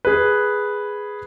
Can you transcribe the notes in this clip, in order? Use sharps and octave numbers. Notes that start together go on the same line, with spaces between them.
G#4 B4